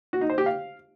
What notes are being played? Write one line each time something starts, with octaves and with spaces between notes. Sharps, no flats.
F#4
D#4
C5
G4
F5